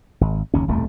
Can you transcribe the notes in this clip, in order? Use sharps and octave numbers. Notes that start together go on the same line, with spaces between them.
G#1
F#1 D#2 C#4
D#1 C2 F2 A3